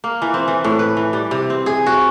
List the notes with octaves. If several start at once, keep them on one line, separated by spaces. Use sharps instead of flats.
A#3
E3
C4
E3
A2
B4
E3
G3
C3
C4
G#4
F#4